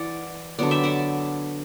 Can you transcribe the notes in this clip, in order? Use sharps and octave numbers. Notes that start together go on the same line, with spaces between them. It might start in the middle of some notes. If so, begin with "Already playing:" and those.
Already playing: E3 D5 F#5
D3 F#3 B3 D5 F#5
E5 G5
D5 F#5